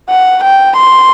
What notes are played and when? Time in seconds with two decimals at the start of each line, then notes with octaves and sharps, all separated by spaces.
0.10 F#5
0.44 G5
0.77 C6